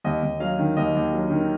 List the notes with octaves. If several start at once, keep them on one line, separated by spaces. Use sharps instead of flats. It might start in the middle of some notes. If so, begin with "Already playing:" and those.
D#2 D#5
D#2
F#3 F5
D#3
D#2 D#5
D#2
F#3
D#3